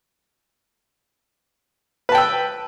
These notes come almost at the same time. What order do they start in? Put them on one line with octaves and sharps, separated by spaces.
B4 A5 G5 E6